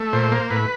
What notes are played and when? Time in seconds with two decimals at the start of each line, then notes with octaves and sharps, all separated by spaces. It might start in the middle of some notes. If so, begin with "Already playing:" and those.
Already playing: A3
0.13 A#2 C5
0.32 A#3
0.50 A2 B4